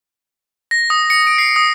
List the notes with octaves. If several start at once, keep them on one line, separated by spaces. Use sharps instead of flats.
A#6
D#6
C#7
D7
C7
D#6